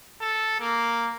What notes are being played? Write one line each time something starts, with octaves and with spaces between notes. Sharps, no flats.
A4
A#3